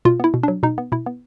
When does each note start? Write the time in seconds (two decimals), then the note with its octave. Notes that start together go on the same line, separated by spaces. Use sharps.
0.05 B2 F4
0.20 B3 E4
0.34 B2
0.43 F#3 D4
0.63 B2 D#4
0.78 B3
0.92 B2 E4
1.06 B3